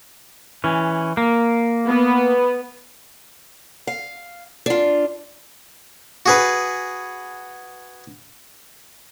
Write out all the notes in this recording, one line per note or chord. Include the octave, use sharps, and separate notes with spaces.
E3 C#4
A#3
B3
F5
D4 F4
F#4 G#4 B4